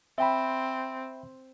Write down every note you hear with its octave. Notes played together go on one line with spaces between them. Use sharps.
C4 E5 G5 B5